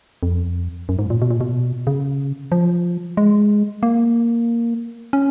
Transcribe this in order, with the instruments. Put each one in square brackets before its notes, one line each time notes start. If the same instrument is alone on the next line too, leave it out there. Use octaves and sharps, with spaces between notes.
[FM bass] F2
F#2
G#2
A#2
B2
A#2
B2
C#3
F3
G#3
A#3
C#4